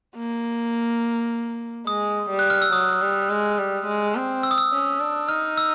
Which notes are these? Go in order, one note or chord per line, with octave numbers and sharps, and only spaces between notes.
A#3
G#3 D#6
G3
F#6
F6
E6
F#3 D#6
G3
G#3
G3
G#3
C4
E6
D#6
E6
C#4
D4
D#4 F6
E6